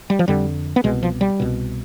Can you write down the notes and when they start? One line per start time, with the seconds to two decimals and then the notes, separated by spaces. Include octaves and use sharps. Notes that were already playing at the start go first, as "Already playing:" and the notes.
0.10 G3
0.19 F3
0.28 F2 D3 G3
0.76 B3
0.84 C2 B2 G#3
1.03 F3
1.21 G3
1.40 C2 B2